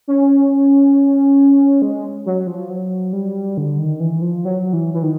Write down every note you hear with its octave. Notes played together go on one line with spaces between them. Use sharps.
C#4
G#3
F#3
F3
F#3
G3
D3
D#3
E3
F3
F#3
E3
E3
D#3